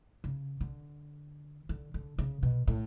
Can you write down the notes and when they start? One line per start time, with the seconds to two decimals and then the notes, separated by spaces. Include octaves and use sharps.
0.24 C#3
0.61 D3
1.69 D3
1.94 D3
2.19 C#3
2.43 B2
2.68 A2